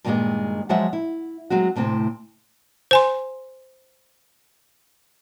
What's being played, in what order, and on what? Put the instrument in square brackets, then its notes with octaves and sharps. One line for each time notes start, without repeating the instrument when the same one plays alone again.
[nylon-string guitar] G2 A#2 D#3 E3 G3 G#3
F3 F#3 G#3 C5 E5 F#5
E4
F#3 G#3 C4 F#4
D2 A2 C3 C4
[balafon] C5 G#5 C6